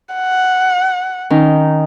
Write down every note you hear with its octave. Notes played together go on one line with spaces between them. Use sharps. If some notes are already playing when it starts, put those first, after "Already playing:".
F#5
D#3 C#4 D#4